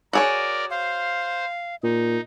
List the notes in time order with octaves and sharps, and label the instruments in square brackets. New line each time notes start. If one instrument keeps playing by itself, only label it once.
[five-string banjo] F#4 G#4 C#5 [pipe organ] A#4 D5
[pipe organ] C5 [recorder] F5
[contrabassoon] A#2 [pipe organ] D#4